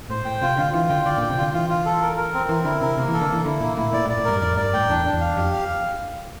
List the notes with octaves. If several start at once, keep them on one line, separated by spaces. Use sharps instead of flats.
A2 C5
A2 G5
C3 F4
D3 F4
E3 F4
D3 G5
D3 D5
A#2 G5
C3
D3 F4
E3 F4
F4
A4
A#4
A#4
C4
E3 A#4
D3 E4
C3 A#4
C3 A#3
E3 A4
D3
E3 A#3
D3 E4
A#2 A#3
A2 E4
A#2 D5
A2
D5
A2
G2 A#4
G2
F2 D5
G2 D5
A2 G5
E2 D4
D4
E2
F5
F2 G4
F5